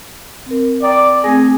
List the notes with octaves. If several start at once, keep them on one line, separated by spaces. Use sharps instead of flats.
C4 A#4
D5 G5 A#5 D#6
A3 C4 G#4 A#6